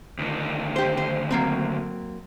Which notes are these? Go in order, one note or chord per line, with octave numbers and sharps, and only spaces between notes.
D2 D#3
G4 C5
C5
F#3 A#3 C4